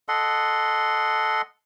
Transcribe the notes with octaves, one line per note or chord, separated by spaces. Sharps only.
A4 D#5 F#5 C6